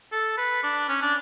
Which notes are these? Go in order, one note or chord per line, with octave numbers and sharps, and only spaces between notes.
A4
B4
D4
C#4
D4